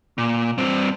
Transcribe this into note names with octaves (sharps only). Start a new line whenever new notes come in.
A#2
G2 C4